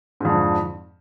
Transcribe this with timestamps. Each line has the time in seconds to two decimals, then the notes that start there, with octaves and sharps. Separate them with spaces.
0.20 G#2
0.25 F2
0.29 D3